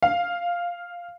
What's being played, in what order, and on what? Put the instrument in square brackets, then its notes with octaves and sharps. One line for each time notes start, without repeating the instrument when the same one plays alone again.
[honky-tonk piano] F5